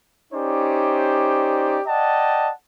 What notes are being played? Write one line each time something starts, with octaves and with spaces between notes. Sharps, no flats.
C#4 D#4 G4 C5 D5
D5 D#5 F#5 G5 A5